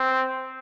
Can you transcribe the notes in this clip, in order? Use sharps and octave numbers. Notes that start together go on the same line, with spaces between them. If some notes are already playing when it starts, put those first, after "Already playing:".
Already playing: C4